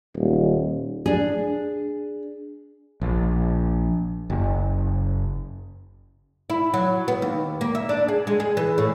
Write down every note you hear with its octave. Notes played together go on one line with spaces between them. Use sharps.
D#1
D4 G#4
A#1
F#1
E4
F#3
B3
D#2
A#3
E5
D4
G#4
G#3
G#4
E3
A2